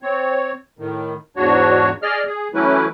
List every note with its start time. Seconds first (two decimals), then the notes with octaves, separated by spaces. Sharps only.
0.03 C4 C#5
0.79 A2 D#3
1.36 E2 G#2 D4 F#4 C#5
2.02 G#4 D5 D#5 F6
2.27 G#4
2.54 E3 F#3 A3 C#4 E4 B4